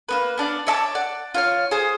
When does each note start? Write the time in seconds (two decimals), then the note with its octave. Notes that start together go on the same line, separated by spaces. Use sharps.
0.09 A#3 B3 B4
0.38 B3 D4 D5 F5
0.67 C#5 E5 A5 D6
0.95 D5 F#5
1.34 F4 C#5 F6
1.71 G#4 C5